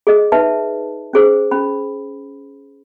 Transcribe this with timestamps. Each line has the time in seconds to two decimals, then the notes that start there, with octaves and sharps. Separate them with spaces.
0.07 G#4 D#5
0.32 D#4 B4 E5 A5
1.13 C#4 G#4 C5
1.51 C#4 B5